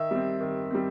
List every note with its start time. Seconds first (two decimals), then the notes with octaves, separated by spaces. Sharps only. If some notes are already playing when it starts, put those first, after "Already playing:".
Already playing: D#3 E5
0.11 G3 C4
0.41 D#3
0.71 G3 C4